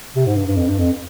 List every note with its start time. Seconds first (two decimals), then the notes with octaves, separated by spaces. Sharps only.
0.16 C3
0.26 G#2
0.36 G2
0.47 G2
0.57 F2
0.69 G2
0.79 F2